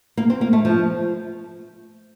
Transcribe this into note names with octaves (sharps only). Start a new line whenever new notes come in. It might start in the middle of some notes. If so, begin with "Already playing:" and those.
A#3
C4
A#3
A3
F3